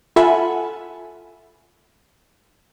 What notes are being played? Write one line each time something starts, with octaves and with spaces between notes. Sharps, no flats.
F4 A4 E5 F#5 G#5 B5